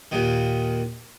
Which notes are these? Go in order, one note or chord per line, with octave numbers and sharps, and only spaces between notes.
D#2 A#2 D#3